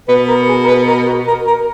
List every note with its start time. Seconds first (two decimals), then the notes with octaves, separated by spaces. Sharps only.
0.08 B2 B4
0.28 A#4
0.49 G#4
0.64 A#4
0.68 B4
0.87 A#4
1.07 F#4
1.27 A#4
1.47 A#4